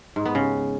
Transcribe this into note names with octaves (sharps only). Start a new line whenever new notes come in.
G#2
B3
C#3